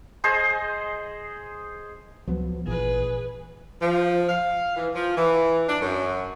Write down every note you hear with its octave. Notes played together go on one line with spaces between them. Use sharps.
G#4 C5 D#5
C#2 F3 F#3 B3
G#1 A#2 E3 G#4 B4
F3
F5
E3
F3
E3
D4
F#2